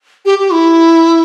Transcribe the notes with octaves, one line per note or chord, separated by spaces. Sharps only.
G4
G4
E4